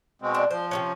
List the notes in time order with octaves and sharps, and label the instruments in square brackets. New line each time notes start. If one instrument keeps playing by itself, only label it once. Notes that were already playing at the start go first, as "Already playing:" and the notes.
[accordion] B2 G#3 C4
[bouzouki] D4
[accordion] F3 [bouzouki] C5
[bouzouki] C3 B3 C#4